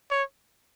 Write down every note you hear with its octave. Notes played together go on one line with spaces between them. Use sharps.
C#5